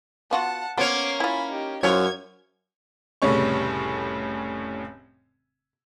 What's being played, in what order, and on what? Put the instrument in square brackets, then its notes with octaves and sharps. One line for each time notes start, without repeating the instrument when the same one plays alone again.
[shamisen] B3 F4 F#4 [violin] F#5 A5
[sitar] A#3 C#4 C#5 [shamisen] B3 C5 [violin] D6 C7
[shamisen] E4 F4 [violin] G#5 B5
[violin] D#4 G4
[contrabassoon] F#2 [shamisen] E4 F4 C5 [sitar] C#5 [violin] G#6
[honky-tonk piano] F1 A2 C#3 G3 C#4 C#6